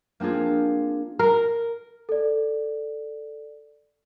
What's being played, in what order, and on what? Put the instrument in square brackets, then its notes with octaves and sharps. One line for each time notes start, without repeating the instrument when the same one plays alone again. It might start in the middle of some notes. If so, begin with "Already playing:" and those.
[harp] A#3 C4 D4 F4 G#4
[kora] A#4
[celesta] A4 D5